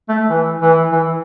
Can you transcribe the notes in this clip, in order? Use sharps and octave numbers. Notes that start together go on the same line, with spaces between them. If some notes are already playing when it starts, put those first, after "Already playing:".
A3
E3
E3
E3